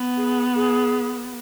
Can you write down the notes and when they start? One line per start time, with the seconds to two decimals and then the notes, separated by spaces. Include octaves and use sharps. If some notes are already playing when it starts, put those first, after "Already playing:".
Already playing: B3
0.17 G#4
0.55 G#4